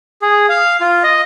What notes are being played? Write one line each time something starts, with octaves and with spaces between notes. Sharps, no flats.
G#4
F5
F4
D#5